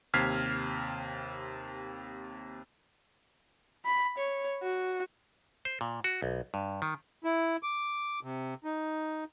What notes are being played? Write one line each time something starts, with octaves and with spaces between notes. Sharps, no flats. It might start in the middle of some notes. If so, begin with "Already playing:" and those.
D#2 C3 F6 G#6 B6 C7
B5
C#5
F#4
C5
A#2
F#4
B1
G2
D#3
E4
D6
C3
D#4